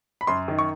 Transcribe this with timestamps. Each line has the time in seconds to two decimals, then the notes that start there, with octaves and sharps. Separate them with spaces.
0.21 B5
0.27 F#2 C6
0.48 D#3
0.59 C#6